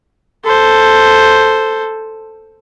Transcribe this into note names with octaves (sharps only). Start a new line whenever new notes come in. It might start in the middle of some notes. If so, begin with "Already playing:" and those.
A4 C5